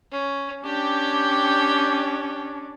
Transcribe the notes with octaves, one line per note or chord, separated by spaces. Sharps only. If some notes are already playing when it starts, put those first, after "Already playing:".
C#4
C#4 D4 G4 G5